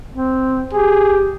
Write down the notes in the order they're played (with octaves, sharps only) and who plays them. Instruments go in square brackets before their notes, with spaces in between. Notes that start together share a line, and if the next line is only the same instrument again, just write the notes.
[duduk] C4
[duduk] G4 [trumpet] G#4